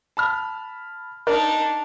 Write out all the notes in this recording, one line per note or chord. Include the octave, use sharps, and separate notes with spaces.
A5 B5 F6
D4 D#4 A#4 D5